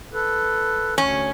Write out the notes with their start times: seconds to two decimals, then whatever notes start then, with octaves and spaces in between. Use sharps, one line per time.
0.13 A4 B4
0.98 D2 C#4 G#5